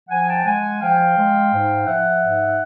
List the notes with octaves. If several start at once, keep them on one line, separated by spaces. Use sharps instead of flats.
F3 F#5 G#5
G5 A5
G#3 F#5 G#5
F3 F5 G5
G#3
G#2
F3 E5 F#5
G#2